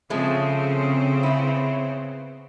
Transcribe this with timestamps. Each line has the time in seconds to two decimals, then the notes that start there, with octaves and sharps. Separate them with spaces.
0.10 C#3 F3 G#3 A3 C4
1.23 B3 E4